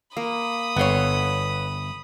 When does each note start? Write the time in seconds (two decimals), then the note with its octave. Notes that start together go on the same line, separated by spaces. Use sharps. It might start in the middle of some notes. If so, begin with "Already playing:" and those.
0.17 A#3 B5 D#6
0.76 G1 B3 A4 C#5 C6